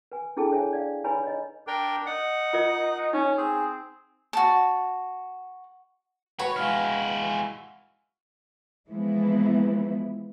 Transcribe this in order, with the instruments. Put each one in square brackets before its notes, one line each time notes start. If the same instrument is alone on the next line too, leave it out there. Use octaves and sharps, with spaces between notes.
[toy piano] B4 G#5
D4 E4 G#4 A4 G5 A5
C5 C#5 E5 G#5
D5 F5
D#4 B4 C#5 G#5 A#5 B5
C#5 D#5
[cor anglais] D4 [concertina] A#4 G5
[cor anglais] D#4 [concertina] F#5
[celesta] F4 A#4 D#5
[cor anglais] C#4 [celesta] D#4
[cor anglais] C4 [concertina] G#4
[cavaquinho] F#4 A5
[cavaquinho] F#4 [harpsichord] B4 [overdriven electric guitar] C#5
[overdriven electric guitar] G#3 E4 [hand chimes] F5 F6
[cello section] E3 F3 G#3 A#3 B3 E4